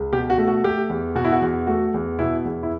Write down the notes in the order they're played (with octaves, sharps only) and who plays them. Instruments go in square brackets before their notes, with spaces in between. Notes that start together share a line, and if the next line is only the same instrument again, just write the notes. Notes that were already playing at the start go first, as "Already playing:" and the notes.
Already playing: [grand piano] C#2
B2 G4
F#4
A3
F#4
A3 G4
E2
B2 F#4
E4
F#4
E2
A3 F#4
E2
B2 E4
E2
E4